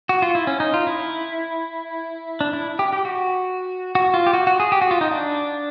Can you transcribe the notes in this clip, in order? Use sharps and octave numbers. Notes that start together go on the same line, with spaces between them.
F#4
F4
E4
C#4
D#4
F4
E4
D4
E4
G4
G4
F#4
F#4
F4
G4
F#4
F#4
G#4
G4
F#4
F4
D#4
D4